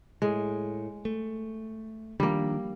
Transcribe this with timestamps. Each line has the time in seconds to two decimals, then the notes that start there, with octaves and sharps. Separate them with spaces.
0.22 A2 G#3
1.05 A3
2.20 D#3 F3 G3 A#3 D4